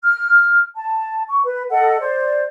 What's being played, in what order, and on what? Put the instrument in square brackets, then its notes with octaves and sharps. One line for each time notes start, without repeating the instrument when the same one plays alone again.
[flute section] F6
A5
C#6
B4
A4 D#5 F#5
C5 D5